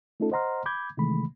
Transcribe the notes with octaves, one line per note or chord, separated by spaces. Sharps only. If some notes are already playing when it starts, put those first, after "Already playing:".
A3 C#4 D#4 F4 A4
C5 D#5 F#5 A#5 C6 F6
B5 D6 G6 G#6
C3 D#3 E3 G#3 A3 B5